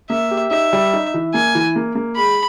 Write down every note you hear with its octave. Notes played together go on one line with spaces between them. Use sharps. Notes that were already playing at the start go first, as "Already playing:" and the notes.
A#3 E5
G4
D#4 E5
G3
D#4
E3
A#3 G#5
E3
A#3
A#3
G#3 B5